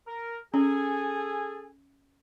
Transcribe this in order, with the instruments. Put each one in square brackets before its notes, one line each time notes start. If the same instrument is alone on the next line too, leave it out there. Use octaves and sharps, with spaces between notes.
[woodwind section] A#4
[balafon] C#4 [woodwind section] G#4 A4 G#5